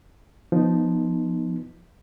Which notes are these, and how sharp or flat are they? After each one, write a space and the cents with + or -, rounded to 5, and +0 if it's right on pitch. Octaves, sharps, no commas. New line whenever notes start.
F3 +0 B3 +0 D#4 +0